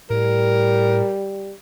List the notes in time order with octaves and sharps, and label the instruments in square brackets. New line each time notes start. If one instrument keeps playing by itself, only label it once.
[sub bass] A2 [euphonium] G3 [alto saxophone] A#4